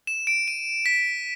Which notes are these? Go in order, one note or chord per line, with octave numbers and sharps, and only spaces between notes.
E7
D7
D#7
B6